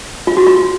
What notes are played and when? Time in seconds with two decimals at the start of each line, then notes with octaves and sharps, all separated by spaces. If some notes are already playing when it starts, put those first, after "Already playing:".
0.27 F4
0.37 F#4
0.47 F4